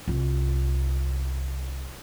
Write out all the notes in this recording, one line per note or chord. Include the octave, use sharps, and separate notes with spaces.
C2 F4